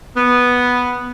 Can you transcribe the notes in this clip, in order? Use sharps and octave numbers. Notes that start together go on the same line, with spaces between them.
B3